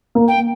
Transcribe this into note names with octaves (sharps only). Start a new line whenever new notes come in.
A#3
G5